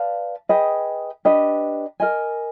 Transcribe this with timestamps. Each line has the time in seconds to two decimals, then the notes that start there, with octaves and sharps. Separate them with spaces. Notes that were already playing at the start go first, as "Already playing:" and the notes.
Already playing: B4 D5 F5 A5
0.49 G#4 B4 D#5 G5
1.25 D4 G4 B4 D#5
2.00 A#4 D#5 G#5